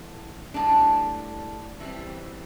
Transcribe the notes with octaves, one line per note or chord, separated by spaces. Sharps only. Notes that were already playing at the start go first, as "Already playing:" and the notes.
Already playing: A2 E3 B3
A2 G3 D4
E3 G3 C4